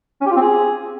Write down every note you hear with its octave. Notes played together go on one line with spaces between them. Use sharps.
C#4
G4
F4
C4
G#4